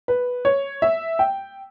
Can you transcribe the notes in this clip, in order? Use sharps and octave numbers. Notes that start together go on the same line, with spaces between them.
B4
C#5
E5
G5